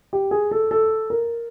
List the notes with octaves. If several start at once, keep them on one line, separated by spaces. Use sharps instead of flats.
G4
G#4
A4
A4
A#4